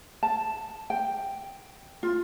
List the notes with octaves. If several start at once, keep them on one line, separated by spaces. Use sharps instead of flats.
A5
G5
F4